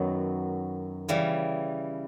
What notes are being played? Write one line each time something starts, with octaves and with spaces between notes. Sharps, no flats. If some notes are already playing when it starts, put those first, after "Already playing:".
Already playing: F#2 D#3 F#3 B3
C#3 E3 G3